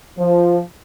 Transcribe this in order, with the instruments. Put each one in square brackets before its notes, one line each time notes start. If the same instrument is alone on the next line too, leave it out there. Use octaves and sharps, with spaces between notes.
[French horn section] F3